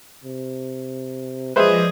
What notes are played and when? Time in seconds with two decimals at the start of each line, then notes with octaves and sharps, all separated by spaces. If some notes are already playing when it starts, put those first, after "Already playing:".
0.24 C3
1.56 F3 G#3 G#4 B4 C5 D5 E5 A#6